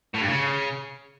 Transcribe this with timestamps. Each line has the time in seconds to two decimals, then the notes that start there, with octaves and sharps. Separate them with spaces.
0.14 A2
0.21 G2
0.28 C#3